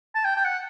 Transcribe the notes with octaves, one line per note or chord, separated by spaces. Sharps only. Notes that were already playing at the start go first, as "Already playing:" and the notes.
A5
G5
G5
F#5